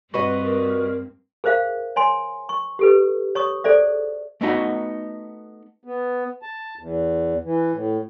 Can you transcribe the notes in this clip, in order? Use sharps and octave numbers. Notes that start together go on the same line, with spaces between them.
G2 G3 C4 F#4 B4 D#5
A#4
G#4 A#4 C5 E5 F5
C#5 G#5 C6
C#6
G4 A4 B4
C#5 C#6 D#6
G#4 A4 C5 D5 E5
A3 B3 D#4 F#4
B3
A5
E2
E3
A2